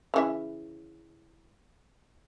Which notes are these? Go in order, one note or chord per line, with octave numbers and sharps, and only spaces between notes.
C#3 E3 E5